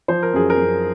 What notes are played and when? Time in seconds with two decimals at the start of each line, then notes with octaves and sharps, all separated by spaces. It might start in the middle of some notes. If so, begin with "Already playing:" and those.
0.08 F3 C5
0.23 A#4
0.33 F#2 G#4
0.50 A#4
0.57 F#2